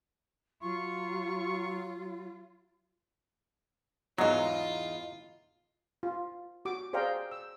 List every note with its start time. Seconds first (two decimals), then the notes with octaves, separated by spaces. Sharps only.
0.63 F#3 F4 C#6
4.18 E2 G#2 F#3 D#4 F4 D#5 A#5 D#6
6.03 F4
6.65 F#4 D6
6.93 G#4 C5 D5 F5 G5 A#5
7.31 E6